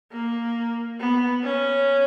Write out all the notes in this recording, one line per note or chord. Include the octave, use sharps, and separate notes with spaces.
A#3
B3
C#4